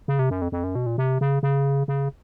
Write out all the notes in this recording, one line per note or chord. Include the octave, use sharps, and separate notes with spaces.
C#3
C3
F#2
F2
F2
F#2
B2
A#2
C3
C#3
C#3
C#3